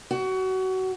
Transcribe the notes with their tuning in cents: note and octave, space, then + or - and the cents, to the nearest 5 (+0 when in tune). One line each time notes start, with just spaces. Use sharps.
F#4 +25